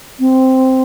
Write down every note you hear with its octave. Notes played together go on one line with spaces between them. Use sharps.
C4